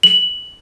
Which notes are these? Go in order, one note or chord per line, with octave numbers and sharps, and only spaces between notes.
F#7